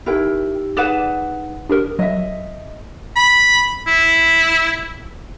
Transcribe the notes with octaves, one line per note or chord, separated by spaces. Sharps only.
D#4 E4 G4 A#4 G5
D#4 G#4 B4 D5 F#5 D6 E7
D4 G4 A#4 D#6
F#3 D#5 E5
B5
E4